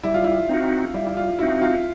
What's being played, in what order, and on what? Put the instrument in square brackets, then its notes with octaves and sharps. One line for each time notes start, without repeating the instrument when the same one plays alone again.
[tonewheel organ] G3 [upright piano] E4
[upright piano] F4
E4
[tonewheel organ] C4 D#4 F#4
[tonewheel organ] G3 [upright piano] E4
[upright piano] E4
F4
[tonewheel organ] C4 D#4 F#4 [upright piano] E4
[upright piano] F4